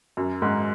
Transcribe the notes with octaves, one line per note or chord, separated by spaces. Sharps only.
F#2
G#2